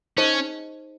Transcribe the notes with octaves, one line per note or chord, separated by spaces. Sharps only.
C#4 D#4 G#4 C5 D#5